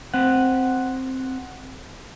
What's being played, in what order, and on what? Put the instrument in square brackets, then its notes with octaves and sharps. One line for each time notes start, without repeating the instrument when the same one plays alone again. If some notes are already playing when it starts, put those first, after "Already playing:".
[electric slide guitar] C4 F#5